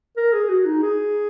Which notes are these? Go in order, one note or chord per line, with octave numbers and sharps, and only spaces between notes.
A#4
G#4
F#4
D#4
G#4